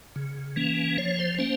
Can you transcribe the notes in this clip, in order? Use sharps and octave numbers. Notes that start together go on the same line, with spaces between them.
C#3
E3 A#3 C#4
F3 C#5
C5
A#3 C#4 C5